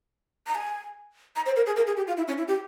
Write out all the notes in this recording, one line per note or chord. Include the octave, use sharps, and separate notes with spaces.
A#5
G#5
A#5
C5
A#4
G#4
A#4
G#4
G4
F4
E4
C#4
E4
G4